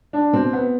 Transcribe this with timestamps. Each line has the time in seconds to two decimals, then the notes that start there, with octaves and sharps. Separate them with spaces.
0.13 D4
0.33 B2 C4
0.53 B3